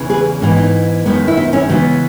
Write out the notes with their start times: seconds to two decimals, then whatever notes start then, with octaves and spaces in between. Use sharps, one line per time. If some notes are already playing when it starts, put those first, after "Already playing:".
Already playing: E2 C#3 E3
0.10 G#4 B4
0.41 G#2 E3 B3 C#4
0.57 D#4
1.06 F#2 D#3 G#3 B3
1.28 E4
1.37 D#4
1.53 C#4 E4
1.69 C#3 E3 G#3 B3 D#4 F#4